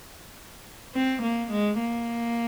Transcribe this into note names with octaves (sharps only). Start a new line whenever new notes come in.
C4
A#3
G#3
A#3